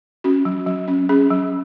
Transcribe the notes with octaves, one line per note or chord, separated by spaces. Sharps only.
C#4 F#4
F#3
F#3
C#4
C#4 G#4
F#3